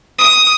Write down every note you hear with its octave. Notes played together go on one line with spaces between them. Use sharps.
D#6